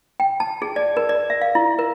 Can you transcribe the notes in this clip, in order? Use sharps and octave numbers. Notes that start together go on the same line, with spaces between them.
G5
A5
G#4
D5
A#4
D5
E5
F5
E4
A#4